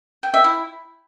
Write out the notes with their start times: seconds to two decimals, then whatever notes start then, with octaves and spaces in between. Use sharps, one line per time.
0.23 G5
0.34 E5
0.44 E4